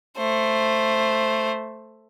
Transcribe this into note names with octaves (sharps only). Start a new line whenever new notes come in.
A3 C5